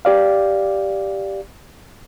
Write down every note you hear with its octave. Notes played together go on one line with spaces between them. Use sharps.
G4 D5 F5